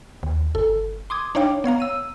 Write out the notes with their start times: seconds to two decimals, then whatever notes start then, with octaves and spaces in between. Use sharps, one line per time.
0.23 D#2
0.55 G1 A4
1.10 C6 D6 D#6 G#6
1.35 D4 D#4 C#5 F5 G5 D6
1.64 B3 C#5 F5 A#5
1.80 E6 D#7